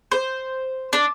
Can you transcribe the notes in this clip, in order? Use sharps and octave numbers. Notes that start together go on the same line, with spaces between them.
C5
D4